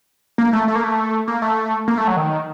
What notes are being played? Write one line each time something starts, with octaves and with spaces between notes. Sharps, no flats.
A#3
A3
A3
A#3
A3
A#3
A3
A#3
A3
F#3
D#3